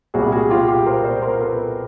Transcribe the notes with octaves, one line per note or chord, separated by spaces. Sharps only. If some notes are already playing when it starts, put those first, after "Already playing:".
C2 A#2 G3 F#4 G#4
F#4 G#4
F4 G4
F4 G4
A#4 C5
C5 D5
A#4 C5
A4 B4